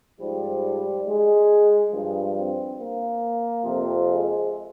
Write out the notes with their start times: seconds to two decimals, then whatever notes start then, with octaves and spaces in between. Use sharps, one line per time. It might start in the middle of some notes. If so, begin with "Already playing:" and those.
0.21 G#2 F3 G3
1.07 G#3
1.93 G2 F3
2.36 C4
2.78 A#3
3.65 F2 C3 F3
4.09 G#3